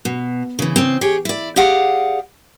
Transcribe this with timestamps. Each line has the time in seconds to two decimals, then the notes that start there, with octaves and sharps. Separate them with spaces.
0.05 B2
0.59 C#3 E3
0.76 C#3 C4
1.01 G4 G#4 C#5
1.25 E4 D5
1.56 G4 G#4 D5 F5 F#5